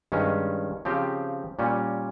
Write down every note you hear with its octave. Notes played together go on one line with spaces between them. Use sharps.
G2 D#3 G#3 C#4
C#3 F3 C4 G4
A#2 G3 C#4